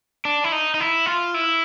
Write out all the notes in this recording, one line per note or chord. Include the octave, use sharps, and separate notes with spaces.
D4
E4
D#4
D#4
E4
F4
E4